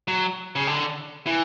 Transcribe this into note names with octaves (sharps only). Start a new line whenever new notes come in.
F#3
C#3
D3
E3